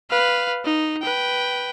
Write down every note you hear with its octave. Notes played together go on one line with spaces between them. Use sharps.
B4 F5
D#4
B4 G5